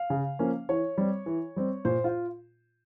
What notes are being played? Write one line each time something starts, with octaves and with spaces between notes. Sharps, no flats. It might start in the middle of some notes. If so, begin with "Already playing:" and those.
Already playing: F5
C#3
F3 A#3 C#4
E3 C#5
G3 C4
E3
G3 C4
A#2 C5
F4